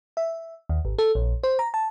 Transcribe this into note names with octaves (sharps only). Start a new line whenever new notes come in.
E5
D#2
G#1
A4
A#1
C5
A#5
A5